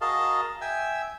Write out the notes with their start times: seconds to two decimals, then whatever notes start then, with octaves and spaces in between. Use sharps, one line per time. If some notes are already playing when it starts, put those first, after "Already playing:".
0.01 F#4 G#4 A#4 D#5 F5 A5
0.61 E5 G5 G#5 E6